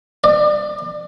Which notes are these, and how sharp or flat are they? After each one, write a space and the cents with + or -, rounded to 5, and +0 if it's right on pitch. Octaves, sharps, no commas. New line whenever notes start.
D5 +30